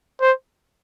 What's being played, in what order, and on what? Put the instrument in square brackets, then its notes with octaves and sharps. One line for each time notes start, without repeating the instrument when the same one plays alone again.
[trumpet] C5